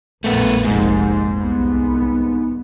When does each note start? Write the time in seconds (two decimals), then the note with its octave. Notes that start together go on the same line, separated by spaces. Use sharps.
0.24 A#1 F2 A#2 A3 B3
0.65 F1 A#1 G#2
1.36 C2 B3